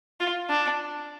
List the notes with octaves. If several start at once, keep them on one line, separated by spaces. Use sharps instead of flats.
F4
D4